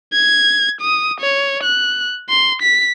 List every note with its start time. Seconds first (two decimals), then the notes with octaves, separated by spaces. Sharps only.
0.14 G#6
0.81 D#6
1.21 C#5
1.64 F#6
2.30 C6
2.62 B6